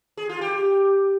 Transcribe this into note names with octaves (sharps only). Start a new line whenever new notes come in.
G#4
F4
G4